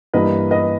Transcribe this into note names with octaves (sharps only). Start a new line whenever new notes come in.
G2 E3 A#3 B4 D#5
B4 D#5